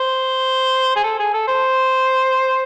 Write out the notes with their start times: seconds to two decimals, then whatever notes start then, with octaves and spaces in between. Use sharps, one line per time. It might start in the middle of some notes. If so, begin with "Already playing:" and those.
Already playing: C5
0.96 G#4
1.04 A4
1.19 G#4
1.34 A4
1.48 C5